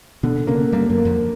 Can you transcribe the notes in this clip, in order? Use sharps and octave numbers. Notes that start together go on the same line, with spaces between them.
B2 D3 B3
C#3 A#3 C#4
G2 G3 A#3
F#2 F#3
A#3
F2 F3